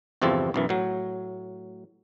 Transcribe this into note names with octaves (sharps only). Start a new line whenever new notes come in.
G1 E2 C3 F3 C4 A4
B1 F#2 E3
A2 F#3